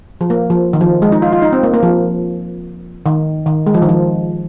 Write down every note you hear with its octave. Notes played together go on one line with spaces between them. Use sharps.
F3
A#3
F3
D#3
F3
G#3
D#4
F4
F4
D#4
C4
A#3
A#3
F3
D#3
D#3
G#3
F3
D#3
F3